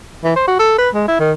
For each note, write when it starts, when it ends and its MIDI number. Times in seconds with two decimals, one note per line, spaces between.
0.24 0.33 52
0.36 0.44 72
0.47 0.58 66
0.59 0.75 69
0.78 0.89 71
0.94 1.06 56
1.08 1.16 64
1.20 1.32 51